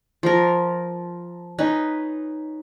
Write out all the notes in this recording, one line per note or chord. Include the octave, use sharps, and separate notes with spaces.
F3 A#4
C#4 D#4 B4